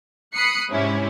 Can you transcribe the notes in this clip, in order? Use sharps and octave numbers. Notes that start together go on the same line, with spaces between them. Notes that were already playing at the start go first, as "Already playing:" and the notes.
B5 D#6 F#6 C7 C#7
G#2 C3 C#4 E4